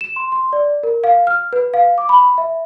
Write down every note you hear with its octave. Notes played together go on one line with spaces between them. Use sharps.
E7
C6
C6
D5
A#4
F5
F6
B4
F5
D6
B5
E5